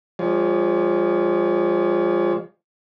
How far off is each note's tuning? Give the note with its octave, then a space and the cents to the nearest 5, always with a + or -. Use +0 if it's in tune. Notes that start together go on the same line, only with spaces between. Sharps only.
F3 +0 G#3 -35 C#5 +40